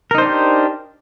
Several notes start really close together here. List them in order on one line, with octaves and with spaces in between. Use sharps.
A#4 D#4 C5 D4 G4